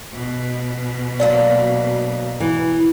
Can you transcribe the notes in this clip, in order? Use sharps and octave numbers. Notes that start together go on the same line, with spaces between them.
B2
D2 F#3 A#3 D5
E3